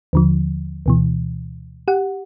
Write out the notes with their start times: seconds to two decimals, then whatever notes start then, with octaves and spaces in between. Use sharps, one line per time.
0.13 D#2 D3 F3
0.86 D2 B2 E3
1.88 G4 F#5